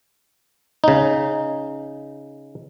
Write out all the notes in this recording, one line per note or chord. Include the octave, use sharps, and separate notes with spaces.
C#3 D#4